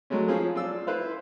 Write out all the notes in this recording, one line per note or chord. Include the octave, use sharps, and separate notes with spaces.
F#3 G#3 A3 C#4
F3 C#4 F4 G#4
F4 D5 E6
E4 B4 C5 F5